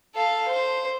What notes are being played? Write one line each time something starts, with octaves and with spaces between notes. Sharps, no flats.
A4 F5
C5